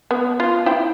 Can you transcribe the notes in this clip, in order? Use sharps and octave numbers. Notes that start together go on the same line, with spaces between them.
B3
F4
E4 G5